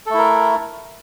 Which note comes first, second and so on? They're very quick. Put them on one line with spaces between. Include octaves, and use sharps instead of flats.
A4 A3 E4 A#4